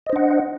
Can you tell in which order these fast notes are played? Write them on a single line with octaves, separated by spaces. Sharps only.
D#5 C5 D4 F#5